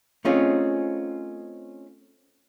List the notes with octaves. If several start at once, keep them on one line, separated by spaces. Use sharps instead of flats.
A3 C4 C#4 D#4 F4 G#4